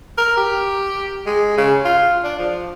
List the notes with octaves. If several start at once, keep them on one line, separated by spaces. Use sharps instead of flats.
A#4
G4
G#3
C#3
F4
D4
F3